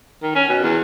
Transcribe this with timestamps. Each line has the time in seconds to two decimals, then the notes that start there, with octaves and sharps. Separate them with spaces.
0.23 D#3
0.35 C#4
0.49 B2
0.63 E2